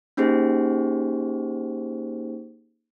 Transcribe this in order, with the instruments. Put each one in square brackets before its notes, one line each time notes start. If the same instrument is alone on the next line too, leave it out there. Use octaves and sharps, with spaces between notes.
[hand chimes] A#3 C#4 D#4 G4 G#4 C5